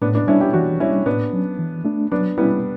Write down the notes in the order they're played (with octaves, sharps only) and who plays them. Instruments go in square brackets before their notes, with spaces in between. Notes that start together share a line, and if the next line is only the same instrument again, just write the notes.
[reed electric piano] A2 [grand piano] B3 D4
[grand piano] B3 D4
[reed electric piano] G3 D4 [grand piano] C#4 E4
[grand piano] E4 G4
[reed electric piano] E3 [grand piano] D4 F#4
[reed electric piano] G3 D4 [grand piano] C#4 E4
[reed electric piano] A2 [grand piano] B3 D4
[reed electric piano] F#3 C#4
E3
A3 D4
[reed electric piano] F#3 [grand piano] B3 D4
[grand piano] G3 B3 [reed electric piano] E4
[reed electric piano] C#4